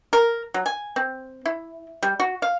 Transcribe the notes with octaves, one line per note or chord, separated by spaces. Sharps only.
A#4
F#3
G#5
C4
E4
G3
F#4
F5